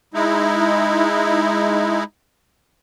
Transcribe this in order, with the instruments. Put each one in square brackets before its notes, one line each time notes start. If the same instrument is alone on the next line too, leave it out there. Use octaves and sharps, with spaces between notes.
[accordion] G#3 D#4 E4